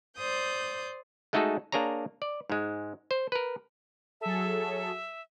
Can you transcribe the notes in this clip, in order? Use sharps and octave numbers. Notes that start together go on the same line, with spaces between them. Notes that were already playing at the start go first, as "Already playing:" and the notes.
C5 D5 D#6 G6
G#3 A3 D#4 F#4 G#4 A4
A#3 D4 G#4 C#5 A#5
D5
G#2 G#3
C5
A#4 B4
F#3 G#4 A4 E5